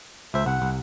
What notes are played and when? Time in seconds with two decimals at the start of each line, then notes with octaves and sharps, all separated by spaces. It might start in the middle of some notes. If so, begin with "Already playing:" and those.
0.34 C#2 C5 E5
0.46 C2 F#5
0.62 C2